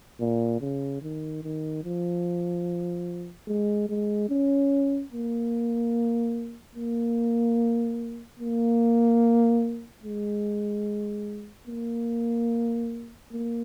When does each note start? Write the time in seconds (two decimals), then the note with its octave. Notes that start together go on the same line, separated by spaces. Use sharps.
0.20 A#2
0.61 C#3
1.02 D#3
1.43 D#3
1.84 F3
3.48 G#3
3.89 G#3
4.30 C#4
5.12 A#3
6.75 A#3
8.39 A#3
10.04 G#3
11.67 A#3
13.32 A#3